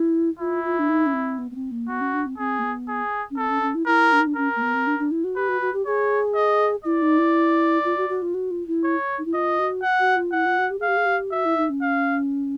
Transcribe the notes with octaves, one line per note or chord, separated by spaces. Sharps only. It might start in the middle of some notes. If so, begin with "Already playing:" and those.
Already playing: E4
E4 F4
F4
D4
D#4
C#4
C4
B3
B3
C4
A#3
B3 F#4
C#4
D4
C4
C4 G#4
A#3
B3
G#4
C#4
C4 A4
C#4
C#4
E4
E4 A#4
D4
D#4
D4
C#4 A#4
A#3
B3
C4
D4
D4
E4
F#4
G4 B4
F#4
F#4
G4
G#4 C#5
D#5
E4 D5
D#4
E4
F4
F#4
F#4
F4
F#4
F4
E4
C#5
D#4
E4
F4 D#5
F#4
F#5
F#4
F4
E4 F#5
F4
F#4
G4
G#4 F5
G4
G#4
G4
F#4 E5
E4
D#4
C#4
F5